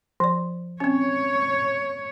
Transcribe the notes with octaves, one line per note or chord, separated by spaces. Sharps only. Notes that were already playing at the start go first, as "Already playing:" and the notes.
F3 D5
C4 C#4 C#5